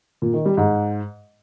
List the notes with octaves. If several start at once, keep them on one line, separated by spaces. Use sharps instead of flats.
A#2
D#3
G3
G#2